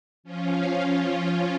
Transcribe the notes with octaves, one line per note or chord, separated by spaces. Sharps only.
F3 C#4 F4